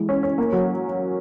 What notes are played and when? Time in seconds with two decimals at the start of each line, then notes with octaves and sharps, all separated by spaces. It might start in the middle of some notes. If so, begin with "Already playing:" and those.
Already playing: E3 G#3
0.09 C#4
0.23 C#4
0.38 A#3
0.53 F#3